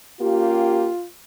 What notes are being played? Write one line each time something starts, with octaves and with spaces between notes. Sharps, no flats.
A#3 C#4 F4 G4